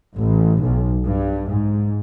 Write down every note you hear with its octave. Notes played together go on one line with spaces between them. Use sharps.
A1
B1
G2
G#2